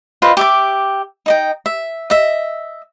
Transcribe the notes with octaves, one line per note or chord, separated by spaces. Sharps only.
F4 B4 C5 D#5
G4 E5 D6
D#4 D#5 G5
E5
D#5 E5